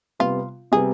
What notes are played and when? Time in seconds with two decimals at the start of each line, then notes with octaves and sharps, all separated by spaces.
0.20 C3 G3 B3 F4
0.72 C3 G3 B3 G#4